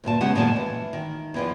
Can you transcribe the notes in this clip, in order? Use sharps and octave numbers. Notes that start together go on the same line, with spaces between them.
D2 G2 A#2 A5
C#3 G#3 B3 C#4 G4 F#5
F#2 A#2 D#3 G#3 C5 A5
E3
D#3
E2 E3 F3